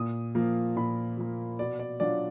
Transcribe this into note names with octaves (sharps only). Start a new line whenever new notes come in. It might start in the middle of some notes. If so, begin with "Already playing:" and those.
Already playing: A#2 D#6
F3 A#3
A#2 B5
F3 A#3
B2 D5
D5
F#3 D4 F4 D5